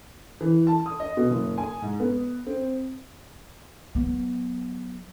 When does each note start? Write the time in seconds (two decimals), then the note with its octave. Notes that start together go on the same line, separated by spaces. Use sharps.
0.41 E3
0.67 A5
0.86 D#6
1.00 D#5
1.17 B2
1.30 F#1
1.58 G#5
1.82 G#2
2.00 B3
2.47 C4
3.95 F#3 B3